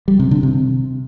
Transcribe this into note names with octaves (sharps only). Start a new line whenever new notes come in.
G3
C3
D3
C3